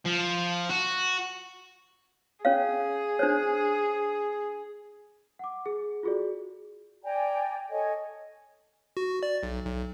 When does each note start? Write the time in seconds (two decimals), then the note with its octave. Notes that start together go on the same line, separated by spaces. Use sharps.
0.06 F3
0.70 F#4
2.45 C#4 G#4 C#5 F5
3.19 D4 C5 C#5
5.39 F#5 D6
5.66 G#4
6.03 F4 F#4 G#4 A4 D5
7.04 D5 G5 G#5 A#5
7.71 A4 C#5 D#5 G#5
8.97 F#4
9.23 D5
9.43 B1
9.65 B1